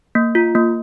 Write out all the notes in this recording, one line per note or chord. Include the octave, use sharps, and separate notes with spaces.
A#3
F4
A#3